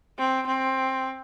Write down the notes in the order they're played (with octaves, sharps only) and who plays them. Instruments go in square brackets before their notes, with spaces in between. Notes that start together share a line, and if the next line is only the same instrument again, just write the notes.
[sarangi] C4
C4